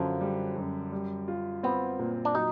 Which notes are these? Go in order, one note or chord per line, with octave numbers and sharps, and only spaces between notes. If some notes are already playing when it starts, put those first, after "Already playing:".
Already playing: F#2 D3 F3
G3
F#2
G3
F4
B3 C4
A#2
D4
F#3 D#4